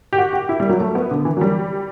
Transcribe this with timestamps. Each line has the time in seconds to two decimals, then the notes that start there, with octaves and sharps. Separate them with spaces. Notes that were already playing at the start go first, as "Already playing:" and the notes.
0.13 G4
0.18 F#4
0.33 G4
0.49 E4
0.60 G3
0.69 F#3
0.80 A3
0.95 B3
1.11 D3
1.25 E3
1.37 F#3
1.41 G3